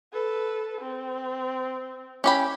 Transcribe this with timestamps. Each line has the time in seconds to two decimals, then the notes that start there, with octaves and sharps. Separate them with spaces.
0.13 A4 B4
0.81 C4
2.24 C#4 E4 G4 B5